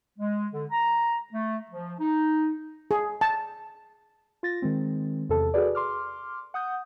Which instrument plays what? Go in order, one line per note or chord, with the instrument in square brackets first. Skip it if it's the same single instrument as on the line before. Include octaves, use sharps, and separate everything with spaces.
[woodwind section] G#3
D3
A#5
A3
F3
D#4
[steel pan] G#4
A5
[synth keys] F4 A6 A#6
D#3 G#3 C4
E2 C3 A4 A5
F#4 G#4 A4 B4 D5
C6 D6 F6
F#5 D#6 G6